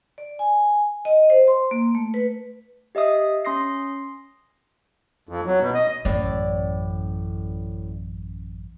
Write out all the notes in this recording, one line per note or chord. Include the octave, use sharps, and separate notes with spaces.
D5
G#5
D#5
C5
C6
A#3
A3
B4
G4 D#5 E5 D#6 C7
C#4 C6 D#6 A#6 C7
F2
F#3
B2
D#5
A1 F#2 A2 D5